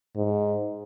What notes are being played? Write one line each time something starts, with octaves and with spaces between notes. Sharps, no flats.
G#2